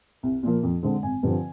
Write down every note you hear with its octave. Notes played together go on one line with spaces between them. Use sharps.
C2
A#2 F3 A#3
F2
D3 G#3 C4
G#1 G#5
G2 D3 F3 C4